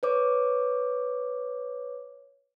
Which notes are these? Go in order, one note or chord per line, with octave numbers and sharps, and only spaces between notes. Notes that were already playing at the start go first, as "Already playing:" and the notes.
B4 C#5 D6